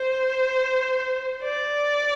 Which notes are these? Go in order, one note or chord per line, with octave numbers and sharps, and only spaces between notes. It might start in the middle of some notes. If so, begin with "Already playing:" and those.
Already playing: C5
D5